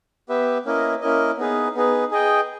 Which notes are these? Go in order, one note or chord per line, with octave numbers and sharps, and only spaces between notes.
B3 G4 B4 E5
A#3 C#4 E4 A#4 D#5
A#3 C#4 E4 A#4 D#5
B3 D#4 G#4 B4
B3 D#4 G#4 B4
G#4 D#5 G5